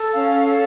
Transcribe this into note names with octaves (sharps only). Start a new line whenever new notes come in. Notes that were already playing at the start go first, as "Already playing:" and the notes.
Already playing: A4
C#4 F5
A4